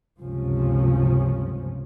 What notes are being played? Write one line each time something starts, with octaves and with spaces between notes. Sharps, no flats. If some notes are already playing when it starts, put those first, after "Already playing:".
G1 C#2 F#2 C3 F3 C#4